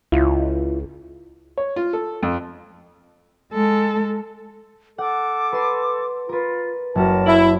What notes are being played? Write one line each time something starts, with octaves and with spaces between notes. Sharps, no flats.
C#2 E4 F4
C#5
F4
A4
F2
G#3 A4
A4 F#5 D6
B4 C6
F4 A#4 B4
F#1 C#4 F#4 A#4 A5
E4